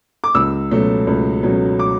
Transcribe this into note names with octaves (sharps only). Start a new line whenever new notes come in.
D6
C#2 E6
B2 F#3 A3 C#4
C#2
B2 F#3 A3 C#4
D6